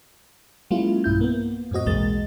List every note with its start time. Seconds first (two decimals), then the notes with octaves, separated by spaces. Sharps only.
0.71 F#3 G#3 A#3 C#4 E4 F4
1.04 B1 G2 E4 G6
1.21 A#3 B3
1.71 F#2 A2 C4 F#4 D#5
1.86 B1 E2 G#3 A#3 D#5 A6